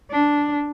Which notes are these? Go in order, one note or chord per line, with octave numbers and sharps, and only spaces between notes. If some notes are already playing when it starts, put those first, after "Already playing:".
D4